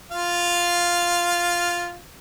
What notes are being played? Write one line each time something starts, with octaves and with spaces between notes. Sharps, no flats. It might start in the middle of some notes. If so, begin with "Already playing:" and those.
F4 F5